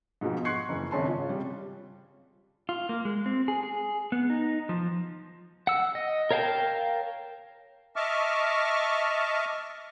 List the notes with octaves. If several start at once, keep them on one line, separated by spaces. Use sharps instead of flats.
G#2 B2 F3 G#3 B3
C6 C#6 F#6 G#6 C7 C#7
F#1 E3
G#1 C#3 C#4 A5 B5 C6
F4
C3 G3
F4
A#3
G#3
C4
G#4
G#4
B3
D#4
F3
F#5 E6
D#5
A#4 C#5 F5 G5 A5
D#5 E5 A5 C#6 D6 F6